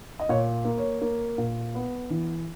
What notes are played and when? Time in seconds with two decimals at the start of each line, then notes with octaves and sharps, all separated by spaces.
0.19 D#5
0.29 A#2 C#5
0.65 A#3
0.78 C#5
1.02 A#3
1.38 A#2
1.75 B3
2.10 E3